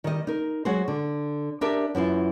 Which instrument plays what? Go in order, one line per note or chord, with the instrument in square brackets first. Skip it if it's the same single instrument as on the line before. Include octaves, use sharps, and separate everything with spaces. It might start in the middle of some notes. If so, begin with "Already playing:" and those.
[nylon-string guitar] D#3 G3 D#5
D#4 A#4
F#3 G#3 F#4 G#4 C5
D3
D4 G4 A#4 D5 E5
F#2 E3 E4 F4